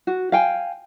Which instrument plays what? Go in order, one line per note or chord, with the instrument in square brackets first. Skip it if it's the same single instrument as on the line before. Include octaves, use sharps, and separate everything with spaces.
[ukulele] F#4
F5 G5 G#5